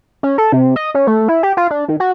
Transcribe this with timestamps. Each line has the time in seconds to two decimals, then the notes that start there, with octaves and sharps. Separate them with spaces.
0.23 C#4
0.38 A4
0.52 C3
0.76 D#5
0.94 C#4
1.07 A3
1.28 E4
1.43 G4
1.57 F4
1.70 D4
1.88 D#3
2.00 F#4